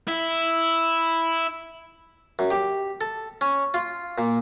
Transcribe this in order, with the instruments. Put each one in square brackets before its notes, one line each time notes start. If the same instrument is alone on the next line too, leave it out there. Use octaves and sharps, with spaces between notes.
[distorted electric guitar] E4
[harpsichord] F#2
G4
A4
C#4
F4
A#2